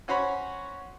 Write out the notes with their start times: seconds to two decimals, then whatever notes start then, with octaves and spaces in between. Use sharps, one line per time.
0.08 C#4 F#4 C5 C#5 B5